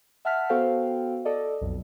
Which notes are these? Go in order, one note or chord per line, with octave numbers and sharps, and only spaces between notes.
E5 F#5 A5 F6 B6
B3 F#4 A4 C5 F5 G5
A4 D5 D#5
B1 F2